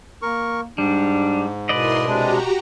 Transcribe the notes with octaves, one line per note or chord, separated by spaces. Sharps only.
A#3 A#4 C#6
G#2 G3 D4
B2 E4 A#4 B4 D5 D#5 C6
C3 G#3 D4 F#4 G4 A#5